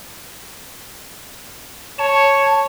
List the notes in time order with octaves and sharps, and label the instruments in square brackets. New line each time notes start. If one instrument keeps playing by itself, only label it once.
[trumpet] C#5 [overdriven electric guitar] A5